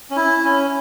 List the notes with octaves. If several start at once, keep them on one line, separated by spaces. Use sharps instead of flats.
C#4
E4
C#4